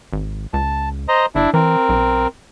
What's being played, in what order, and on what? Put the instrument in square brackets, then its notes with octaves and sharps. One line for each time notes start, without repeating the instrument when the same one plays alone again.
[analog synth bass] G#1
[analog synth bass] C#2 [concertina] A5
[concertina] C5 D#5 A#5
[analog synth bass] G1 [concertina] D4 E4
[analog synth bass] E3 [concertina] C4 A#4
[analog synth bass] B1